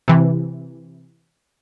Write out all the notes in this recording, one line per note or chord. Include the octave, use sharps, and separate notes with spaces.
C3 E3